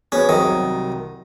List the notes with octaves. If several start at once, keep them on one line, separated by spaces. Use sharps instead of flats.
B3 C#4 F#4 G#4
C2 C3 D#3 F#3